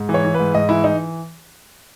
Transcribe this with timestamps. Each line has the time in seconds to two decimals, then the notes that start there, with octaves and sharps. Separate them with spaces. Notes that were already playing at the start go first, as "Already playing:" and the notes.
Already playing: G#2
0.09 E3
0.14 C#5
0.25 E3
0.34 G#2 B4
0.54 G#2 D#5
0.69 E3 E4
0.84 E3 D#4